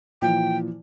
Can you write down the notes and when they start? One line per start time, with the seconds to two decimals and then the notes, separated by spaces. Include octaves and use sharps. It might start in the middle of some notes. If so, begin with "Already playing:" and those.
0.22 A#2 E3 F3 G5